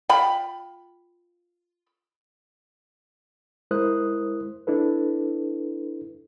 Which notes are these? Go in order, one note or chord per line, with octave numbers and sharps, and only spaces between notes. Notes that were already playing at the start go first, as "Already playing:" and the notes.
F4 G5 B5
G#3 E4 A#4 C5 D#6 F#6
D4 E4 A4 B4